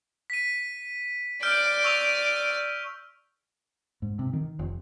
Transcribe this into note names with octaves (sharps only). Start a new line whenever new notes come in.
B6 D#7
D5 F6 G6 D7
C#6 E6 F7
G#2
C3
D#3
F1